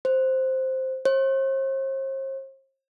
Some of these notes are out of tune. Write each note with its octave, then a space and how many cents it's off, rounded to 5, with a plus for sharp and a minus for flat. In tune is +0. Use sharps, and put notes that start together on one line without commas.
C5 +0
C5 +45